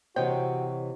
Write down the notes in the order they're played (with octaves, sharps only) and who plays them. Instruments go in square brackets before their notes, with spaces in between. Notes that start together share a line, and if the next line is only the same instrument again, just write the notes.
[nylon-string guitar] C3 E3 [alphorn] F#4 [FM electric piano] C5 C#5 D#5 [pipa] G5